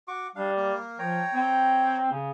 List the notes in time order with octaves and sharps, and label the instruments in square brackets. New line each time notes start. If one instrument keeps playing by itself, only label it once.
[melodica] F#4 C#6 D6
[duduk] G3 [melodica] D4 F5
[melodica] A#3 A#4
[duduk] F3 [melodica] C#5 G5 A#5
[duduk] C4
C#3